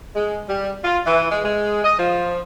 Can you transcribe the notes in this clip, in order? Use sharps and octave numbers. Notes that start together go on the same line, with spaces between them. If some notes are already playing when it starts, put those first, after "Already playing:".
G#3
G3
F4
E3
G#3
G#3
D#5
F3